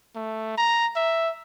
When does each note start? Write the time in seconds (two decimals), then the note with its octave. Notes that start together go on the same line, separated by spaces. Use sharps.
0.16 A3
0.58 A#5
0.96 E5